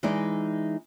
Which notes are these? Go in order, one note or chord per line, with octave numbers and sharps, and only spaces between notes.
E3 G#3 D#4 E4 D5